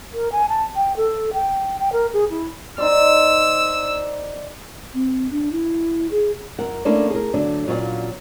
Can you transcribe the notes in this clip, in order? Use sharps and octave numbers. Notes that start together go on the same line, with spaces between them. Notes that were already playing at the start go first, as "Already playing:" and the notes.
A#4
G#5
A5
G5
A4
G5
G5
A#4
G#4
E4
D#4 C5 D5 E6
C4
D4
E4
G#4
F#2 A#4 F#5
A3 A#3 C#4 D4 E4
G#4 A#4
D3 F#3 A3 D4
A#2 F#3 C#4 C#5 F5 F#5